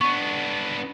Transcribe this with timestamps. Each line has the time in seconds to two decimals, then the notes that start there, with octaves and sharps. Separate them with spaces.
0.01 B3 D4 C#6